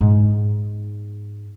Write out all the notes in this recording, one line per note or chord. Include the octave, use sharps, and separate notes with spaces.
G#2 B3